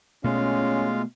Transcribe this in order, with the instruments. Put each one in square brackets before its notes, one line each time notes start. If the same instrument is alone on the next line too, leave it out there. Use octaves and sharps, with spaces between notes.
[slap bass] B2 A3 [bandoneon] G#3 F4 F5 [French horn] C#4